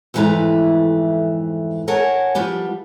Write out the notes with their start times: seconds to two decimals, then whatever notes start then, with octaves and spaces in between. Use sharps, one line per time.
0.14 F2 G#2 E3 A3 B4 A#5
1.88 A#4 C#5 F#5 G#5 A5
2.35 F3 G3 B3 G4